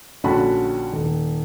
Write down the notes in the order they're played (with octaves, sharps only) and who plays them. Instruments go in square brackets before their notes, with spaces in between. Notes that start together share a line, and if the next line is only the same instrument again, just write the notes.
[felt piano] A#1 D3 C#4 F#4 A5 B5
D#1